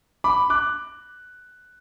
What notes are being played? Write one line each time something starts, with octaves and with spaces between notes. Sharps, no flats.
B5 D6
D6 F#6